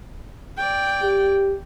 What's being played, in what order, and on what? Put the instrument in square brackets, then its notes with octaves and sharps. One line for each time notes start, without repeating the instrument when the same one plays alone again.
[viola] D5 G5
[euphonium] G4